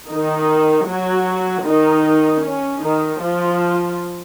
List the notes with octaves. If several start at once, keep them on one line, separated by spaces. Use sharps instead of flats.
D#3 D#4
F#3 F#4
D#3 D#4
C#4
D#3 D#4
F3 F4